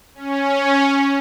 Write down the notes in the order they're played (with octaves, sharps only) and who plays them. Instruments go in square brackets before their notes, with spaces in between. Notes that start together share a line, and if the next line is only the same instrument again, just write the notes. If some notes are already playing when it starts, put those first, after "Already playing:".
[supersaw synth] C#4